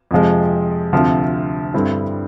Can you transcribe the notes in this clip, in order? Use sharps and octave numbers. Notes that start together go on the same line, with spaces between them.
F2 C3 F3 G#3
D2 C3 F3
G2 D3 G3 C4 E4